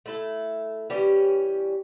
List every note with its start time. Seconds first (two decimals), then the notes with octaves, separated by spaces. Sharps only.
0.06 A3 E4 A4
0.90 E3 G3 C#4 G4